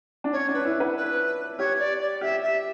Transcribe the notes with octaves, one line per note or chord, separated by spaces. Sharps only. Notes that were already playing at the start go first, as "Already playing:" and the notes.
D4
C#4 C#5
D4
B4
E4
B4
B4
G4 C#5
D5
D5
G4 E5
E5